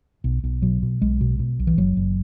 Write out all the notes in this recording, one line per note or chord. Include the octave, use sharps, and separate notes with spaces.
B1
B1
B2 F#3
B2
B1 G#3
B2
B2
B1
E3
F#1 F#3
F#1